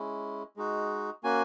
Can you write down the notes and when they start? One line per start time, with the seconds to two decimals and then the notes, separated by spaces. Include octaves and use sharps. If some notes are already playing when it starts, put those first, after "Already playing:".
Already playing: G#3 C#4 E4
0.57 G#3 D#4 F#4
1.24 A#3 C#4 F#4 G#5